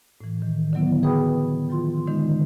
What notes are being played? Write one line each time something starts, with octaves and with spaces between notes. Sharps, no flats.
A2 E3
D#3
D3 D#3 F#3 B3 E4
F#4 G#4 B4 G5 B5 D#6
D#3 F3 F4 C6
D3 D#3 G#3 D#4